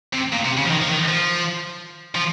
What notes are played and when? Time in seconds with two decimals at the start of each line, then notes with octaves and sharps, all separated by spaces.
0.13 C3
0.32 A#2
0.45 C3
0.57 C#3
0.66 F3
0.70 D#3
0.82 F3
0.89 D#3
1.08 F3
2.15 F3